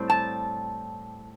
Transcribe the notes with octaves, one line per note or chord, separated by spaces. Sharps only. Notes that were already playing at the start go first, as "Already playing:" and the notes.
Already playing: A2 G3 C4
A5